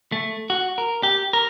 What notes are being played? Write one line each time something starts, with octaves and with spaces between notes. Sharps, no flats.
A3
F#4
A#4
G4
A#4